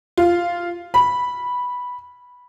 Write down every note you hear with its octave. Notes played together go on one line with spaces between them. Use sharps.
F4
B5